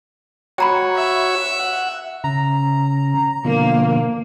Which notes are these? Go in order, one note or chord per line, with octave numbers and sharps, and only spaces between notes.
F#4 C#5 G5 A#5 B5
E5
F#5
C#3 A#5
B2 D3 F3 A#3